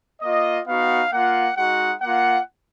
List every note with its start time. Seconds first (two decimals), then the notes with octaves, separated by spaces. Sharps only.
0.22 A#3 F4 D#5
0.67 B3 D#4 F#4 F5
1.12 A#3 F4 F#5
1.57 G#3 D#4 F#4 F#5
2.02 A#3 F4 F#5